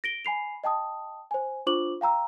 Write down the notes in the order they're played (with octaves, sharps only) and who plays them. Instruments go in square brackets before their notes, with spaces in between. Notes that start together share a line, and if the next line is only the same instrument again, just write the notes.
[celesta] A#6 D7 G7
G#5 B5 C7 F7
D#5 G5 A5 D#6
C5 G#5
D4 F4 C5 C#6 D6 F#7
F5 G5 A#5 E6